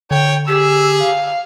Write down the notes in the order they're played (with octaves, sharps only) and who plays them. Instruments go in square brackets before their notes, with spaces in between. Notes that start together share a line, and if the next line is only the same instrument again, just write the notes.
[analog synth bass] D3 [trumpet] C#5 [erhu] G5
[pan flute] G4 [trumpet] G#4 [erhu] E6
[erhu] F5